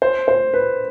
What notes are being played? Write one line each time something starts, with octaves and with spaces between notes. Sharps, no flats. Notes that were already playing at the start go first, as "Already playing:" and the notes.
C5
C5
B4